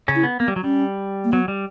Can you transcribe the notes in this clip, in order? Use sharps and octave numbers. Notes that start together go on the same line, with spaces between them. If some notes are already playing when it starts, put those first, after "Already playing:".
C#3 C#4
E4
B3
A#3 B3
G3
F#3
G3 C#4
A#3
F#3 B3
G3